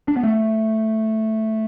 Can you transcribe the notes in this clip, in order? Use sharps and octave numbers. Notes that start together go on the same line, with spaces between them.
D4
B3
A3